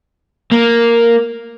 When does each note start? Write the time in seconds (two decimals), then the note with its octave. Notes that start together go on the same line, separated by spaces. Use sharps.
0.52 A#3